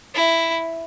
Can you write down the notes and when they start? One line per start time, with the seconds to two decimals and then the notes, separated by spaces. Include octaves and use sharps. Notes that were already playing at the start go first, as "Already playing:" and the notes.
0.15 E4